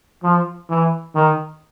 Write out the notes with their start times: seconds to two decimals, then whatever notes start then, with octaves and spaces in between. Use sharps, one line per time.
0.23 F3
0.70 E3
1.15 D#3